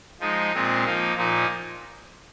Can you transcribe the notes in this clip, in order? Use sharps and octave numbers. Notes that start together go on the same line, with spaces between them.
F3 G#3 D#4
A#2 G#3 C4 F4
F3 A#3 D#4
A#2 F3 A#3 D#4